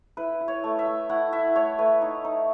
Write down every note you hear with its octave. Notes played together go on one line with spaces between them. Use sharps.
E4 B4
E4
C#5
A3
E5
A3
E4 F#5
E4 E5
A3 C#5
A3 B4
D#4 C#5
D#4